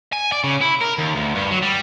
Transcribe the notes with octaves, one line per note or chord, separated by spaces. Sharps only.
G#5
D5
C#3
E4
A#4
D#2
D2
G2
F#3
G3